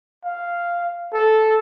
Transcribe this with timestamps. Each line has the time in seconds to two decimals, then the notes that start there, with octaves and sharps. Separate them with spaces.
0.24 F5
1.13 A4